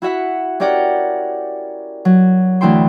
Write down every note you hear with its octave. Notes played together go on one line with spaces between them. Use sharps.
E4 F#4 E5 F#5
C#4 G4 A#4 D5 F#5 G5
F#3
D2 E3 E4 G5 C6